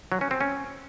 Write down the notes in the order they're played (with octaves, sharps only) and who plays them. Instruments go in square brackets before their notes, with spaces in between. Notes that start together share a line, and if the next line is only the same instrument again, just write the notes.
[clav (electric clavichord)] F#3
C#4
C4
C#4